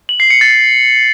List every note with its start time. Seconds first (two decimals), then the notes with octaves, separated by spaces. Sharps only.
0.09 F#7
0.20 C7
0.30 C#7
0.41 A6